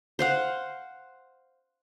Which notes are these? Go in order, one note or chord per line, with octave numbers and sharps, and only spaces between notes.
C5 F5 F#5